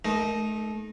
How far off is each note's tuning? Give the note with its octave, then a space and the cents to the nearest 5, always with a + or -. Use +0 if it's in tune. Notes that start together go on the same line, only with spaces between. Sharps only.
A3 -35 D#4 +0 A#4 +0